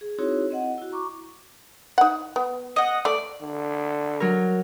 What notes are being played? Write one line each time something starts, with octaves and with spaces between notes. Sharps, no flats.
G#4
C4 D#4 E4 F#4 G#4 C#5
C4 D#5 F#5
E4 F#4
A#5 C#6 D6
D#4 F#5
B3
D#5 F#5
A3 D5
D3
F#3 A#4